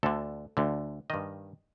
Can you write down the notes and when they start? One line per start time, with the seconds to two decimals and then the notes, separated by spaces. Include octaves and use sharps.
0.03 D2 D3 A4
0.57 D2 D3
1.10 G2 D#3 D#5